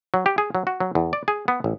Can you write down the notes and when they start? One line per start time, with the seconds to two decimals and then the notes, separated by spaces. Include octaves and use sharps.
0.14 F#3
0.26 G4
0.38 G#4
0.55 F#3
0.67 F#4
0.80 F#3
0.95 E2
1.13 D5
1.28 G#4
1.48 B3
1.64 A1